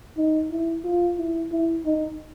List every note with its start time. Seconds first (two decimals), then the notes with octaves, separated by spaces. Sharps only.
0.17 D#4
0.51 E4
0.84 F4
1.18 E4
1.52 E4
1.85 D#4